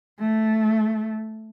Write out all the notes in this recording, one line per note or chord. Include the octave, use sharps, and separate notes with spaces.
A3